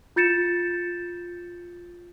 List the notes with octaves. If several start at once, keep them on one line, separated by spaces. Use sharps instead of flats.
F4 G6 A6 C#7 E7